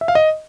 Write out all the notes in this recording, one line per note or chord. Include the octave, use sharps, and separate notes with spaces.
E5
F5
D#5